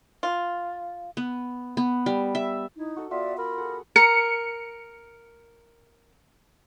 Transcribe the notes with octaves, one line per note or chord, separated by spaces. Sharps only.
F4
B3
B3
G3
E5
D#4 E4
F#4 A4
B3 F4 F#4 D5 E5
A#4 B5
G#4 A4 F#5
A#4 C#7